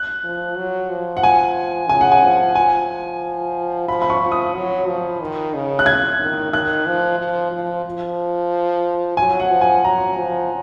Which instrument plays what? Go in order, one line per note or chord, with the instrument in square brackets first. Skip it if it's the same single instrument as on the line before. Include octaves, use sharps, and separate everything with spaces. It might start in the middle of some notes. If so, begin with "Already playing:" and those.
Already playing: [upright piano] F#6
[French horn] F3
F#3
F3
[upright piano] F#5
G#5
[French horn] C#3 [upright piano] G#5
[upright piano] F#5
G#5
[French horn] F3
[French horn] F3 [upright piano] G#5
[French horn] F3 [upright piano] B5
[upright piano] B5
C#6
[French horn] F3
[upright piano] D#6
[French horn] F#3
F3
D#3
C#3
[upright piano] F#6
G#6
[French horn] D#3
[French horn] D#3 [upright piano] F#6
[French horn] F3
F3
F3
F3
[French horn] F#3 [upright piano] G#5
[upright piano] F#5
[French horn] F3
[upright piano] G#5
[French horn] F#3 [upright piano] A#5
[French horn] F3